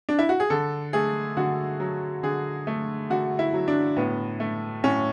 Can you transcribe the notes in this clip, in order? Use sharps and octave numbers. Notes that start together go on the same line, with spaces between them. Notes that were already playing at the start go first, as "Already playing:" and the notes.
D4
E4
F#4
G#4
D3 A4
A3 G#4
D3 F#4
F#3
D3 G#4
A3
D3 F#4
E4
F#3
D4
A2 B3
A3
A2 C#4